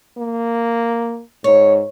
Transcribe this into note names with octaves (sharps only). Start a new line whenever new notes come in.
A#3
G#2 C#5